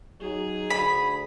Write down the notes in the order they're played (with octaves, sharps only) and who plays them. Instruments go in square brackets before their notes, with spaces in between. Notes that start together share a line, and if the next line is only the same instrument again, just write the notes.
[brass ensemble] F#3 D#4 [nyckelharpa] G#4
[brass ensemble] D2 [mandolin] B5